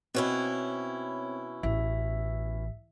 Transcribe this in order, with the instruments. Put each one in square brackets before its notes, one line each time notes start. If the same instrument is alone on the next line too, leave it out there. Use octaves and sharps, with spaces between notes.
[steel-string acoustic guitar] B2 C#4 E4 [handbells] C4 C#5
[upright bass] A1 [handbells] E5